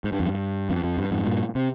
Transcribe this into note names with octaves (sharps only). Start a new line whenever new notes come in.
G#2
G2
F2
G2
F2
F2
G2
F2 G#2
G2 A#2
C3